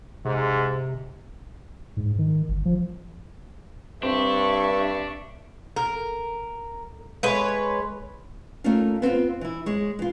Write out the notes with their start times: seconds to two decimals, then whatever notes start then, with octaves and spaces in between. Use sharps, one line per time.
0.25 G#2 C3
1.97 G#2
2.18 D#3
2.48 G1
2.65 F3
4.03 G2 C4 D4 E5 C#6
5.76 A#4
7.23 G#3 B4 C#5
8.64 A3 A#3 C#4 D#4 F4 F5
9.02 B3 C4 D#4 F4
9.41 E3 E4
9.66 G#3 C#5
9.99 E3 F4